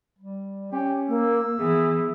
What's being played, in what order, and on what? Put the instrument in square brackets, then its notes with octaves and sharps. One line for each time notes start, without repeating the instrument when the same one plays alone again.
[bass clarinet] G3
[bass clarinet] C#4 [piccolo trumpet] G4
[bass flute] A#3 [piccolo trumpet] E6
[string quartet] E3 [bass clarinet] B3 [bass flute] G#4